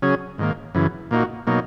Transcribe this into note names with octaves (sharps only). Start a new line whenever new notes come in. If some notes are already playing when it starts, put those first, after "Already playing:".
C#3 F#3 C#4 G#4
G#2 D#3 A#3
F#2 C#3 E3
A#2 A#3 D#4 F#4
B2 F#3 A#3 D#4